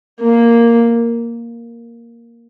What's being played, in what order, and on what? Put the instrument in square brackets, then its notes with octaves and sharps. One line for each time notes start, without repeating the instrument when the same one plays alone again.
[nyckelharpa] A#3